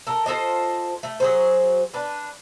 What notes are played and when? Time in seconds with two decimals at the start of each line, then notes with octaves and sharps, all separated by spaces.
0.07 A4 A#4
0.26 F4 A4 C5 D#5
1.03 A3
1.20 F#3 G#4 C5
1.93 D4 B4